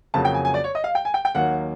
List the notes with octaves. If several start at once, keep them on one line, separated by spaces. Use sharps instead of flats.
F2 C#3 F#3 A#3 A5
G5
G#5
G#5
D5
C#5
D#5
F5
G5
G#5
G5
G5
D#2 D#3 F#3 A#3 F#5